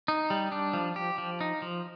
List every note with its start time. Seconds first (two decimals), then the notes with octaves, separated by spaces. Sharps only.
0.08 D#4
0.30 G3
0.52 D4
0.74 F3
0.96 G4
1.18 F3
1.41 D#4
1.62 F3